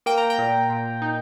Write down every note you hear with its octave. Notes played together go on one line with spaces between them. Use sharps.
A#3 G5
A#5
G5
A#2
A#2
D#4